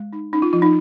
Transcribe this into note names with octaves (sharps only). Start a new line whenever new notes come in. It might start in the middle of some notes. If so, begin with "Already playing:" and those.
Already playing: G#3
D#4
C#4 D#4
F4
F3 F4
D#4